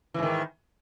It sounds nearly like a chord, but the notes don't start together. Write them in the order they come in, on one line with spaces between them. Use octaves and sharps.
E3 G#2 D#3